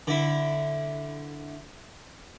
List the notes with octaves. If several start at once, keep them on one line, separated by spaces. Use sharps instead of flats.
D3 E4